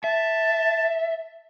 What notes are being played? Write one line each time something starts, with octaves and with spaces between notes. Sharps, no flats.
E5 A5